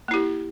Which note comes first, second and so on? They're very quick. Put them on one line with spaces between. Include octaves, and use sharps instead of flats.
A#3 E4 G4